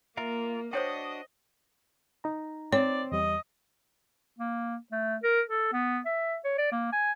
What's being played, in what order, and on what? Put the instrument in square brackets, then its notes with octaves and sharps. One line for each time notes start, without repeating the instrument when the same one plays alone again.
[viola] A#3 [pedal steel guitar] F4 A#4 [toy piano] E5
[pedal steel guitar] D4 F#4 [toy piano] C5 C#5 G5 [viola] D#5
[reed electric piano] D#4 A#5
[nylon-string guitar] C4 [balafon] C#5 [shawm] D5
[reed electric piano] E2 G3 [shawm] D#5
[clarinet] A#3
A3
A#4
A4
B3
E5
C#5
D5
A#3
G#5